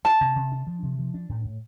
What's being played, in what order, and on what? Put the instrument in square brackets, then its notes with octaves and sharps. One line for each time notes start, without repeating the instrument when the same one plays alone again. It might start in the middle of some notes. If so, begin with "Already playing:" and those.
[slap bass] D4 [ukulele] A5
[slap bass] C3
C3
D4
F3
C3
F3
D4
A2
A2